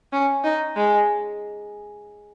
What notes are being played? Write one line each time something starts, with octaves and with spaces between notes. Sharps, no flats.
C#4
D#4
G#3